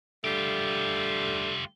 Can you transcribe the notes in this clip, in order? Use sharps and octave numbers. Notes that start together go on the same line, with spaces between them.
D3 G3 A3 F4 G4